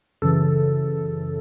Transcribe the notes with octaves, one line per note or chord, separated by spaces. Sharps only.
F#2 C#3 E3 A4